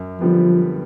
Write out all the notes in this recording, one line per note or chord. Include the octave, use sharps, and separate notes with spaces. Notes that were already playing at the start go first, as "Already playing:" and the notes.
Already playing: F#2
D3 F3 G3 B3